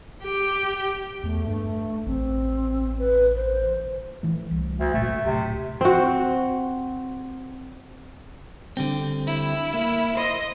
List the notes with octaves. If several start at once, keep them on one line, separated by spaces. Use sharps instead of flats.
G4
E2 A3
G2 A3
A1 C4
B4
C5
E3 A3
C2
D2
G1 A#2 A3
D1 C3
C4 F#4
D3 G3 C4
E4
A#3
C5 D#5